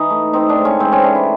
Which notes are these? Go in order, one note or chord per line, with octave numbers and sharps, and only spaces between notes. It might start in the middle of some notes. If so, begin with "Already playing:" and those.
Already playing: E3 D#4
A3
C4 D#4
D4
G#2
C#4
E3 C4
C#4
A3 D4
E4